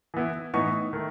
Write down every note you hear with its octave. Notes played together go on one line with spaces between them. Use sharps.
E3 B3 E4
A2 E3 B3 D#4 C#6
D#3 A3